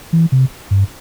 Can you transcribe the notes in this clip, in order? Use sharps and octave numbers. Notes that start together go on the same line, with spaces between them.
E3
C3
G2